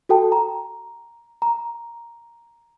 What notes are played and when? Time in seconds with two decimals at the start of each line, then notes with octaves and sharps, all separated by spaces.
0.09 F#4 A4 G5 A5
0.32 A#5
1.42 A#5